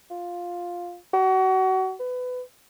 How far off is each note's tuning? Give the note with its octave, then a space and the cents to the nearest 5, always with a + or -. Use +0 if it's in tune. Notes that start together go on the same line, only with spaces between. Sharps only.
F4 +5
F#4 +30
B4 +20